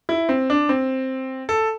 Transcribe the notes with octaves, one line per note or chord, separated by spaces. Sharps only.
E4
C4
D4
C4
A4